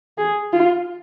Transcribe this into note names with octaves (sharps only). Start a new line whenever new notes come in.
G#4
F4